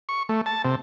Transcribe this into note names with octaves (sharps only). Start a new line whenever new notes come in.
C#6
A3
A5
C3